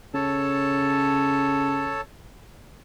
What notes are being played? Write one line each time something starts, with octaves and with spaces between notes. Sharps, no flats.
C#3 A4 C#5 A5